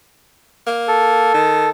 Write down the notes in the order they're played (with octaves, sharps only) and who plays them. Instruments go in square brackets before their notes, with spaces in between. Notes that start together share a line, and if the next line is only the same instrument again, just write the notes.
[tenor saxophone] A#3
[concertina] A4
[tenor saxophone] D#3